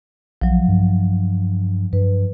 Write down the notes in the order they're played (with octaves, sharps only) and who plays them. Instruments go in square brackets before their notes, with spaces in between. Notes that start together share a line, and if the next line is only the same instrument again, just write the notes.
[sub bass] A#1 [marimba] F3 F#3
[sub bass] G2
[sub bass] G2 [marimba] B4